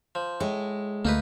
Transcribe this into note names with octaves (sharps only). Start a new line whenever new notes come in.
F3
A2 G#3
D2 A3 A#3 D#4 B4